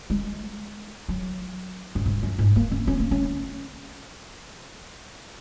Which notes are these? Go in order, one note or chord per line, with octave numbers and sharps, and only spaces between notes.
G#3
F#3
F#2
G#2
F#2
G#2
A#3
C#4
C#4
A#3
C#4